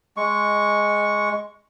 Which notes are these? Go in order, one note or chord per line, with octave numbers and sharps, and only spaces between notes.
G#3 C#6